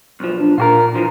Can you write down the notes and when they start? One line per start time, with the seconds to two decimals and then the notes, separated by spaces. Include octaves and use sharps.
0.20 B1 F3
0.40 D4
0.58 A#2 F4 F#4 A#4
0.95 E3 F3